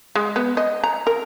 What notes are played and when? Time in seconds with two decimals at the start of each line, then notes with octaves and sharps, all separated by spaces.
0.15 G#3
0.36 B3
0.57 D#5
0.84 A#5
1.07 A#4